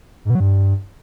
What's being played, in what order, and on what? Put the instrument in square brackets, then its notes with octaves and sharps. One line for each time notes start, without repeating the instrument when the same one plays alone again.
[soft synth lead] G#2
B2
F#3
G2